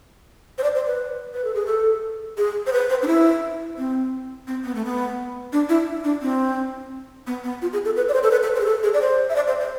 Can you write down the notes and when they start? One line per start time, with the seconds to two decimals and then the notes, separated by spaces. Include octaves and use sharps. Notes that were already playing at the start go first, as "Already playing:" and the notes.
0.58 C5
0.64 D5
0.75 C5
0.87 B4
1.34 B4
1.44 A4
1.54 G#4
1.66 A4
2.38 G#4
2.67 C5
2.73 B4
2.90 C5
3.02 D4
3.07 E4
3.78 C4
4.47 C4
4.64 B3
4.75 A3
4.85 B3
5.53 D4
5.69 E4
6.04 D4
6.22 C4
7.27 B3
7.44 B3
7.62 F4
7.73 G#4
7.85 A4
7.96 B4
8.09 D5
8.14 C5
8.23 A4
8.31 B4
8.43 A4
8.55 C5
8.60 G#4
8.66 A4
8.83 G#4
8.94 D5
9.02 C5
9.30 E5
9.36 D5
9.48 C5
9.60 C5